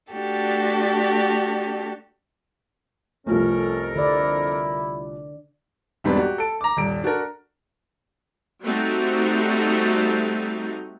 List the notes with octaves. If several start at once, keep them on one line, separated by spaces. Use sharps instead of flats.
A3 D4 F#4 G4 A4
C2 F2 F3 A3 C#4 A4 A#4
D3 E4 D5
E1 G#2 B2 G3 C4 B4
F#4 G4
A4 D7
A#5 D6
D#1 G2 D7
D4 F#4 A4 A#4
G3 A3 C4 D#4 F#4